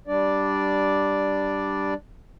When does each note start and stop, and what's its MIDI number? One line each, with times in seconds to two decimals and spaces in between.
0.07 1.94 55
0.07 1.94 62
0.07 1.94 74